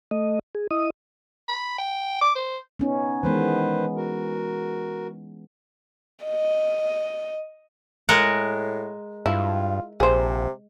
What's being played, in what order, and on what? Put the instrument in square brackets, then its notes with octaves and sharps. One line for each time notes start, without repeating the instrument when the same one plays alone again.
[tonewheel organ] A3 D#5
G#4
E4 D#5 D#6
[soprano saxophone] B5
G5
D6
C5
[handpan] B3 C#4 D#4
[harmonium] D#3 B4 C5 [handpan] E3 G#3 B3
[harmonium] F#4 A#4
[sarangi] D#5
[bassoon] A2 [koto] G#3 A#4 F#5
[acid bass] G2 [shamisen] E4 [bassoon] F4
[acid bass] A#1 [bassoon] C3 [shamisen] G#4 C5